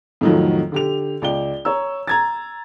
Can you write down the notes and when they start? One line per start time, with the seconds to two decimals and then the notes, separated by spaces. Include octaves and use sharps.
0.21 F2 A2 D#3 F3 F#3
0.72 D3 G4 F7
1.22 C#2 D5 G5 G7
1.65 C#5 A#5 E6
2.07 A#5 G#6 A6